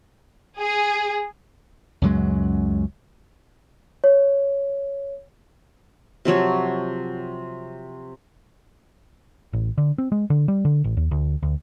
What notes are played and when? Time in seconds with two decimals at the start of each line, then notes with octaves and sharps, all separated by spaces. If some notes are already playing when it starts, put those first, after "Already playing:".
0.58 G#4
2.02 C#2 F#2 F#3 G#3
4.04 C#5
6.25 C3 F3 F#3 C#5
9.53 A1
9.78 D3
9.98 C4
10.12 G#3
10.30 D3
10.48 G3
10.65 D3
10.84 A1
10.97 D#2
11.11 D2
11.43 D2